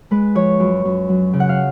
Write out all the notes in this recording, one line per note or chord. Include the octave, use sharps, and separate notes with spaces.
G#3 B4
F3 C#5
F#2
F#2
F#3
C#3
F#5
F5